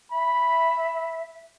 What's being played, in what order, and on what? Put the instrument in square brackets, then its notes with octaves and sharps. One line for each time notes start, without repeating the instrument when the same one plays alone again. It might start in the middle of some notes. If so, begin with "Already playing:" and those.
[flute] E5 [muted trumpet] B5